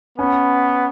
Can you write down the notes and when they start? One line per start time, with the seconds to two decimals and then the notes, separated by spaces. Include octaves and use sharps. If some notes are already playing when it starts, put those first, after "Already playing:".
0.18 B3 C#4